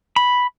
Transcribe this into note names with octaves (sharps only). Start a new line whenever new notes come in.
B5